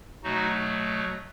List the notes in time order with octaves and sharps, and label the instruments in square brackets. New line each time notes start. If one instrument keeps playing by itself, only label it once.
[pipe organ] B2 F#3 A3 D#4 F#4